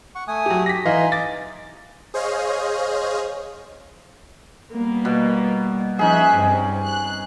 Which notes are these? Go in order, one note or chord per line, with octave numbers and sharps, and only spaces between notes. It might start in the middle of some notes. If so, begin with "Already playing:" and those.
F#5 C#6
A3 G#5 D#6
F#3 G4
G4 A#6 B6
E3 D#4 D#5 F5 G#5 C6
D#5 D6 A6
G#4 C5 C#5 D#5 F5
G3 A#3 B3
B2
F3 C#4 D#4 G#4 E5 F#6
G2 C3 G3
F#6